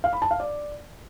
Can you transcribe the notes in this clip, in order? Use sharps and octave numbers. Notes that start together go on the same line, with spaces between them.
F5
B5
A5
F5
D5